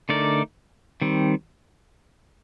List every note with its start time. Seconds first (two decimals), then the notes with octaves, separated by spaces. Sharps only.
0.09 D3 A3 D#4 A#4 D5
1.01 D#3 G3 C4